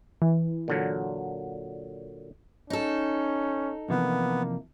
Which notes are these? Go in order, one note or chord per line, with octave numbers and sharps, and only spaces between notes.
E3
A#2 D3 F#3
C#4 D#4 A4
C3 E3 F3 A#3 B3